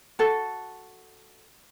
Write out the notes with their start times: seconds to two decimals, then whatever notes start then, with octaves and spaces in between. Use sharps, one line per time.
0.19 F#4 A4